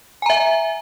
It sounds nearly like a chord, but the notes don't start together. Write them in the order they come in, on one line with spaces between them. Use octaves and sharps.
G#5 A#5 E5